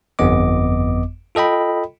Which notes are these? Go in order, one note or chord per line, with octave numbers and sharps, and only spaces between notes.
G1 F2 B3 D#5 D6
F4 A4 D#5 G5 B5